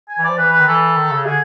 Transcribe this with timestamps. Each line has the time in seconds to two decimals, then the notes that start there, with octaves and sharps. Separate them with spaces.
0.09 G#5
0.19 E3
0.24 F3 D5
0.38 E3 B4
0.52 B4
0.60 D#3
0.68 E3 A4
0.97 D#3
1.11 C#3
1.26 D3 G#4